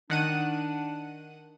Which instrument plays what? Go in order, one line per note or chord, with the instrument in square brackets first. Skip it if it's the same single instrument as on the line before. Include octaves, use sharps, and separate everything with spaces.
[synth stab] D#3 F#5 D#7 [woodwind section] D4